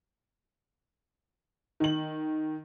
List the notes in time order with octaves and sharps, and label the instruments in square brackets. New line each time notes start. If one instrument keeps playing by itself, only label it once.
[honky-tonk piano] D#3 F#7